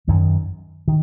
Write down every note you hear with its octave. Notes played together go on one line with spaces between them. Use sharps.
F#2 D#3 F#3
D#3